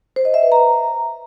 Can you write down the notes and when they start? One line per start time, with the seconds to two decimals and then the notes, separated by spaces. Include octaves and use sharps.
0.16 C5
0.25 D#5
0.34 E5
0.43 B4
0.52 A#5